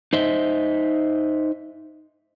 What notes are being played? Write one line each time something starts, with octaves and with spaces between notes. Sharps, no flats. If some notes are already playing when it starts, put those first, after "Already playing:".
D#4 C5 D#5 E5